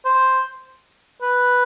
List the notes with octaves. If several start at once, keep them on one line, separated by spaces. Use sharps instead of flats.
C5
B4